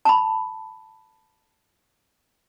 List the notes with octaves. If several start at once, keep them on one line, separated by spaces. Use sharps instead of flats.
A5 B5